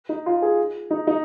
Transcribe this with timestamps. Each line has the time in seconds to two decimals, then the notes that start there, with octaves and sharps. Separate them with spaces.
0.09 D#4
0.26 F4
0.42 G#4
0.91 D#4
1.07 D#4